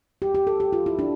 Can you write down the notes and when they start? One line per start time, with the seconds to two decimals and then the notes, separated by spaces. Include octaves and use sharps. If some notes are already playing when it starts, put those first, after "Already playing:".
0.22 G4
0.35 G4
0.47 A4
0.60 G4
0.73 F4
0.86 E4
0.99 D4